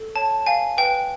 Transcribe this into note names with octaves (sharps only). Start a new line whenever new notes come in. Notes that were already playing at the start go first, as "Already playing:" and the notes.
Already playing: A4
C#5 A5
F5 G#5
B4 G5